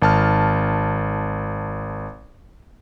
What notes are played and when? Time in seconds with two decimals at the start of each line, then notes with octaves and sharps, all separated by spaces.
0.02 G#1 A5 F6